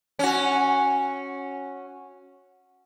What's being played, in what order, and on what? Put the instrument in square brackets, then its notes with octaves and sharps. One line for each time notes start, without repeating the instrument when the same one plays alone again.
[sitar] C#4 F#4